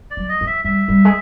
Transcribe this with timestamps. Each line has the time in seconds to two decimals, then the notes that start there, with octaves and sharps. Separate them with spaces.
0.11 D5
0.17 F#3
0.29 D#5
0.41 F3
0.47 E5
0.64 G3 E5
0.88 G3
1.05 G#3